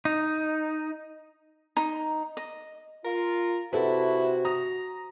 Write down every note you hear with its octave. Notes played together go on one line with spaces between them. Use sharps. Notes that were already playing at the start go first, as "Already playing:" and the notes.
D#4
D#4
D#5
F4 A#4
C3 E4 F#4 A4 B4
A#5 D#6